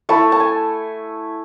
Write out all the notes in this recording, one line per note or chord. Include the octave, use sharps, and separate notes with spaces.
A3 E4 A5
A5
G#5